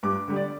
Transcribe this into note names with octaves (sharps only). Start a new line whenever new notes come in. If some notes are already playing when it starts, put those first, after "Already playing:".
G2 D6
D3 G3
D5